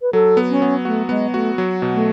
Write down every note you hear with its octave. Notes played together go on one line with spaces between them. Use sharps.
B4
F#3 A4
B3
C#4
B3
A3 F#4
G#3 B3
A3 F#4
F#3
B2
A3